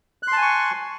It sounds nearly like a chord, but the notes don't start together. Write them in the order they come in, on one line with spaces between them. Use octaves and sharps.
F#6 C6 A5 G#5 C#6